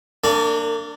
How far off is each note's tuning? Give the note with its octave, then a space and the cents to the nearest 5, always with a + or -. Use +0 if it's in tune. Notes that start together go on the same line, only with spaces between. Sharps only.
A#3 -35 D4 +0